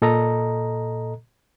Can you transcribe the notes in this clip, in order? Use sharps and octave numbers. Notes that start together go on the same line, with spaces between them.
A#2 A4 D#5 A#5